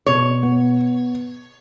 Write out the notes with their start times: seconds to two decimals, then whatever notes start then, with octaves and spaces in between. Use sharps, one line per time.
0.06 B2 C#5
0.43 B3